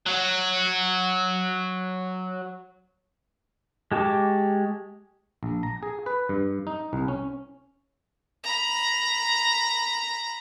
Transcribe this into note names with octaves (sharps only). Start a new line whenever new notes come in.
F#3 F#4
G#3 G4 A5 C#6 D6
A#1
A#5
G#4
B4
G2
D#4
C2
C#4
A#5 B5